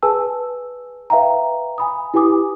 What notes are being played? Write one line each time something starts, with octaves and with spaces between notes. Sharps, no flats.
G#4 B4 G#5 A5 E6
B4 E5 F5 G5 A#5
G#5 B5 D#6
E4 G4 B4 G#5 D6 D#6